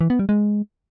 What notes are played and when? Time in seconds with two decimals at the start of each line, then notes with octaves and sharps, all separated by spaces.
0.01 E3
0.10 B3
0.19 G3
0.29 G#3